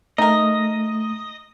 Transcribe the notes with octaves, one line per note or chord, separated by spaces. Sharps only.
A3 D#4 A#4 D#5